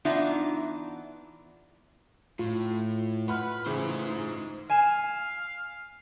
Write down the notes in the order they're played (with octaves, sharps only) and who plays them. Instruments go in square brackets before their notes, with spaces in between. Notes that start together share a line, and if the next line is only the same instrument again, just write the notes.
[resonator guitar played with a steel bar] E3 B3 D4 D#4 F4 E5
[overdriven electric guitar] A2 [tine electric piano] F4
[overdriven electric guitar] B4 [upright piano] F#5 B5 F6
[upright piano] A2 C#3 E3 [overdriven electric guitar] D#4 C5
[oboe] F5 [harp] G#5 E7